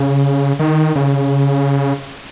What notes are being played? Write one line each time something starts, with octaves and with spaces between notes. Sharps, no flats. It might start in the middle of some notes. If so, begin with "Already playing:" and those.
Already playing: C#3
D#3
C#3